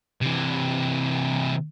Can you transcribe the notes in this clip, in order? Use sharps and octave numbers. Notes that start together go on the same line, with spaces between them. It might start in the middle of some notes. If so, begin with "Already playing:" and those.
C3 E3